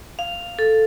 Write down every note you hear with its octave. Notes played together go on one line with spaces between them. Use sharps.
F5
A4